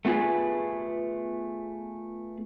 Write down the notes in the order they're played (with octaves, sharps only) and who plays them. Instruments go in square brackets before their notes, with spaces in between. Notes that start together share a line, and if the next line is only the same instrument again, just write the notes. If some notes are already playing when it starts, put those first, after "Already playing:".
[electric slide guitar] A3 B3 F4 G#4 B4